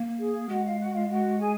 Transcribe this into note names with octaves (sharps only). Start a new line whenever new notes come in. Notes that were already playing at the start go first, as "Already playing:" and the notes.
Already playing: A#3
G#4
G#3 F#4 F#5
F4 F5
F#4 F#5
F4 F5
F#4 F#5
G#4 G#5